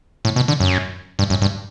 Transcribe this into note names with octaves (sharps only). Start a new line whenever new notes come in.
A2
B2
D3
F#2
G2
F#2
G2